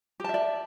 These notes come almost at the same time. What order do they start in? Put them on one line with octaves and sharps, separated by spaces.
G4 A5 E5 D5